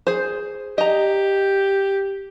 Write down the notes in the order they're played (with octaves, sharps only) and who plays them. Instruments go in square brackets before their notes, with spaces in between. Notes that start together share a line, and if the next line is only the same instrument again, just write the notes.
[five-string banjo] G#4 C5
[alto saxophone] G4 [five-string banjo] D#5 A#5